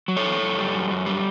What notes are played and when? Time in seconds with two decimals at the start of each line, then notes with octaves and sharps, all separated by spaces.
0.08 F#3
0.17 A4 C#5
0.25 E2
0.42 F#2
0.58 G3
0.74 F#2
0.91 F#2
1.06 G3